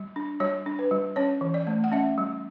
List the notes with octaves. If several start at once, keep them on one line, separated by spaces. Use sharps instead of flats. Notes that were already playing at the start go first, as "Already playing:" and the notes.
Already playing: G3
D4
G3 C#5
D4
B4
G3
C#4 C#5
E3
D5
A3
F#5
C#4 E5
G3